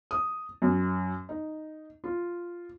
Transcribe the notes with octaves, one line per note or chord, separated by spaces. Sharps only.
D#6
F#2
D#4
F4